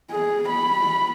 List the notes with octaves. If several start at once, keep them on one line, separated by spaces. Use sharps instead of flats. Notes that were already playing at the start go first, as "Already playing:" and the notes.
G#4
B5